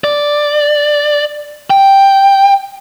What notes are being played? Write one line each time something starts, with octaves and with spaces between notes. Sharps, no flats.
D5
G5